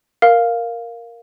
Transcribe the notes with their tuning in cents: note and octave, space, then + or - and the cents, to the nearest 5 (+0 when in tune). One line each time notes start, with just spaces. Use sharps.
A#4 +0 F5 +0